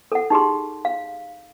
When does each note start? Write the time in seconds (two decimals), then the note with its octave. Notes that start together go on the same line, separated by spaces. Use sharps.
0.12 A4 F#5
0.30 D#4 G4 G#4 C6
0.85 F5